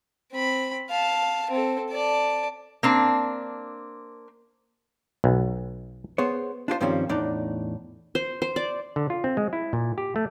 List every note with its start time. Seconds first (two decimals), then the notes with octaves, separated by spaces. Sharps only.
0.33 C4 B5
0.90 F5 A5
1.51 C4 A4
1.91 D5 A5
2.83 A#3 C4 D4
5.24 B1
6.18 B3 G#4 C5 C#5
6.68 D4 F4 G4 C5
6.81 G2 D#3 F3 G3 C4 C#4
7.09 E2 A2 D4 D#4 D5
8.15 C5
8.42 C5
8.56 D5
8.96 D3
9.10 F4
9.24 C4
9.37 G#3
9.53 E4
9.73 A#2
9.98 G4
10.16 A3